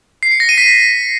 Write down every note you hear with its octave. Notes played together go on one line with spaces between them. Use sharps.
C7
C#7
A#6
D#7
B6